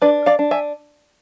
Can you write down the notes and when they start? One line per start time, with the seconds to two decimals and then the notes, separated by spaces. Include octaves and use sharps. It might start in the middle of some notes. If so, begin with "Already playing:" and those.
0.02 D4 B4 D5
0.26 D5 F5
0.39 D4
0.51 E5 G#5